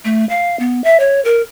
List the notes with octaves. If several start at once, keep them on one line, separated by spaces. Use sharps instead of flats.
A3
F5
B3
E5
C#5
A#4